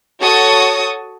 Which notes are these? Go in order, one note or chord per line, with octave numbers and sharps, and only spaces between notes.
F#4 A4 C#5 C#6 D#6